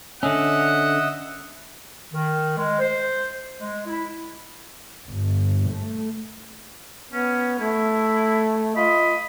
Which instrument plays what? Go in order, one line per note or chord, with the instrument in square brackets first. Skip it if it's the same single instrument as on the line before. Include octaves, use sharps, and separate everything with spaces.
[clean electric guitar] D3 C#4 [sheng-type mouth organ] D#5 E5 [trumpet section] F#5
[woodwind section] D#3
G#3
C5
G#3
E4
[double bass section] G1
A3
[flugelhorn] B3 [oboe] C#4
[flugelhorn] A3 [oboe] E4
[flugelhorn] F4 [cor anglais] D#5 [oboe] B5